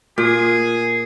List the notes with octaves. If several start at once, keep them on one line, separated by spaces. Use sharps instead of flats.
A#2 G#4